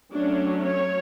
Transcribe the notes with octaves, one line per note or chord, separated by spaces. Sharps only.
F#3 A3 C#4 D4
C#5